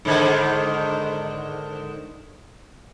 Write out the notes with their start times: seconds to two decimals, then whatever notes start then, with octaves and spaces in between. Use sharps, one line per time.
0.05 G#2 D3 D#3